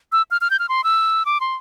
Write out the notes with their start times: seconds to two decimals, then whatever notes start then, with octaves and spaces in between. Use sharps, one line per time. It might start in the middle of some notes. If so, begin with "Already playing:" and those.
0.12 E6
0.31 F6
0.41 F6
0.50 G6
0.59 F6
0.69 C6
0.84 E6
1.26 D6
1.40 C6